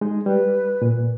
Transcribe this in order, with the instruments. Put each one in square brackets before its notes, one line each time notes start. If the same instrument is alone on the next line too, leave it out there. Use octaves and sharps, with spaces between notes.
[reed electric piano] G#3 D#4
[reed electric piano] G3 [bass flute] B4
[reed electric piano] A#2